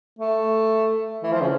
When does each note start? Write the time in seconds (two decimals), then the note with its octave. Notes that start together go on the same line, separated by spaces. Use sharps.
0.19 A3
1.23 E3
1.32 F3
1.41 C#3